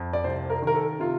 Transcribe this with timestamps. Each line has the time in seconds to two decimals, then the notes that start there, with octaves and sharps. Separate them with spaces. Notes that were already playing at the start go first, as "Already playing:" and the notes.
Already playing: F2
0.13 D5
0.24 C2 C5
0.50 A#4
0.62 D#3 A#4
0.75 A4
1.00 C3 F4